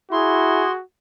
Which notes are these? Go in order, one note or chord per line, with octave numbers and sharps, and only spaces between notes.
E4 F#4 G#4 C6